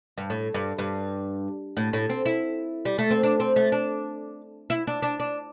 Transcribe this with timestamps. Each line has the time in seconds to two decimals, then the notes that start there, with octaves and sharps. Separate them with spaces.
0.18 G2
0.30 A2
0.54 G2
0.78 G2
1.77 A2
1.93 A2
2.10 C4
2.26 E4
2.85 G3
2.98 A3
3.10 C4
3.23 D4
3.40 C4
3.56 A3
3.72 D4
4.70 E4
4.87 D4
5.02 D4
5.20 D4